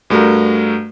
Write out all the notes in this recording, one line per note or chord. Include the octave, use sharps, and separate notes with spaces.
G2 A3 F#4 A#4